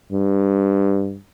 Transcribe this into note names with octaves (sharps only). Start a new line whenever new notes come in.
G2